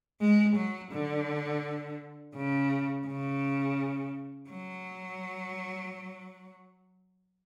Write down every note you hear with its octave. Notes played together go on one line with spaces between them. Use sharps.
G#3
F#3
D3
C#3
C#3
F#3